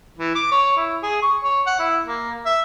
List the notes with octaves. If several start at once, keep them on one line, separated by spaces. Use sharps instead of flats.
E3
D6
C#5
E4
G#4
C#6
C#5
F#5
E4
A#3
E5